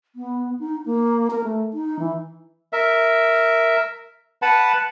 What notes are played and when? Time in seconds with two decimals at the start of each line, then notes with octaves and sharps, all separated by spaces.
0.16 B3
0.59 D#4
0.86 A#3
1.30 A#4
1.44 A3
1.73 D#4
1.99 E3
2.73 A#4 E5
4.42 B4 F#5 A5 B5